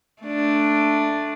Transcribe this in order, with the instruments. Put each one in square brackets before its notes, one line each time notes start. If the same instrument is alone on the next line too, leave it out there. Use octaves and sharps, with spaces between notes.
[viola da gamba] A3 D4